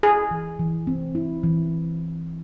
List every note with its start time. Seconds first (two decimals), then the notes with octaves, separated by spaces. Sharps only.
0.03 E4 G#4
0.31 E3
0.59 E3
0.87 C4
1.15 E4
1.43 E3